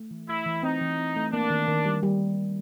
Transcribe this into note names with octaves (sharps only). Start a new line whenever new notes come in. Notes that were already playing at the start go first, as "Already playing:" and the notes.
Already playing: A3
E3
A3 E4
E3
C4 D#4
E3
C4
A3
A#3 D4
D#3
D#3
G3
G3